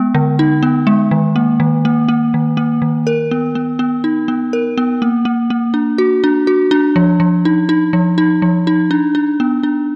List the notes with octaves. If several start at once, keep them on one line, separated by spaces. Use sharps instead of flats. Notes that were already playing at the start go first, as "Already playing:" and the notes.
Already playing: G#3 B3
D3
D#4
B3
G#3
D#3
A#3
D#3
A#3
A#3
D#3
A#3
D#3
A#4
B3
B3
B3
D#4
B3
A#4
B3
A#3
A#3
A#3
D4
F#4
D4
F#4
D4
F3
F3
D#4
D#4
F3
D#4
F3
D#4
D4
D4
B3
D4